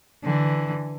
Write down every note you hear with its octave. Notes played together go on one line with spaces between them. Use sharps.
D3 E3